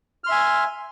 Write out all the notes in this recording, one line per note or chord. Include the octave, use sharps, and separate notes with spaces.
E5 G#5 C6 F6